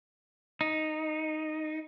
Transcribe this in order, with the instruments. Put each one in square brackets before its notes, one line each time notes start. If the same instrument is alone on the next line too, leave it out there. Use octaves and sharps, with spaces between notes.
[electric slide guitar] D#4